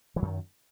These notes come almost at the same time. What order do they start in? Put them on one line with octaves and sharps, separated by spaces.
E3 F#3 F#2 D#3